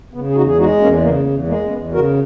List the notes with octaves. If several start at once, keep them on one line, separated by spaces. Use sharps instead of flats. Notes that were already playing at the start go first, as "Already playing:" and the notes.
C#3 B3
G#4
E2 D#4 F#4
G#4
G#3 D#4 F#4
E2 A#3 C#4
C#3 A#3
E2
G#3 A#3
C#4
E2 B3
C#3 F#4 A#4